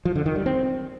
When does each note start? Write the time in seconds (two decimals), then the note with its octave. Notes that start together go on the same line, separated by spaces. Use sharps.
0.05 F3
0.16 D3
0.26 D#3
0.36 G3
0.46 C4